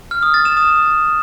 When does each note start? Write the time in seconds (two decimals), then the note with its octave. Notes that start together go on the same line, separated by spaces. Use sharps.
0.11 F6
0.23 D#6
0.34 A6
0.45 E7
0.57 D#6